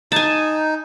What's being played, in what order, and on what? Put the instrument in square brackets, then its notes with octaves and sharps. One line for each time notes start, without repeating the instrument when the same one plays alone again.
[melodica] D#4 [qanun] G#5 A5